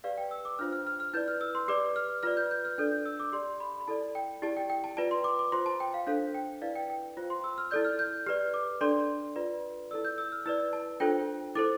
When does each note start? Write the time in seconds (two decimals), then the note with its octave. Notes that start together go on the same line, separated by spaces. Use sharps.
0.04 G4 B4 D5 F5
0.18 G5
0.31 E6
0.45 D6
0.59 D4 F4 C5 F6
0.72 F6
0.87 F6
1.00 F6
1.13 E4 B4 D5 G6
1.28 F6
1.41 E6
1.55 C6
1.68 G4 B4 D5 D6
1.96 F6
2.23 F4 B4 D5 F6
2.37 G6
2.51 G6
2.65 F6
2.78 D4 A4 D5 G6
2.92 G6
3.05 E6
3.20 D6
3.32 G4 D5 C6
3.60 B5
3.81 B5
3.88 E4 A4 D5 A5
4.15 G5
4.42 E4 G4 D5 A5
4.57 G5
4.70 G5
4.84 A5
4.97 F4 B4 D5 A5
5.11 C6
5.24 D6
5.39 D6
5.52 F4 C5 C6
5.66 A5
5.80 G5
5.94 F5
6.07 D4 A4 C5 F5
6.34 G5
6.62 E4 B4 D5 F5
6.75 G5
6.90 G5
7.17 F4 C5
7.30 C6
7.44 E6
7.58 F6
7.71 E4 A4 D5 G6
7.85 F6
7.99 G6
8.26 G4 B4 D5 F6
8.54 D6
8.81 D4 A4 D5 C6
9.36 F4 B4 D5
9.91 E4 A4 D5 E6
10.05 G6
10.18 E6
10.32 F6
10.46 E4 B4 D5 E6
10.73 A5
11.00 D4 F4 A4 C5 G5
11.55 E4 A4 C5 D6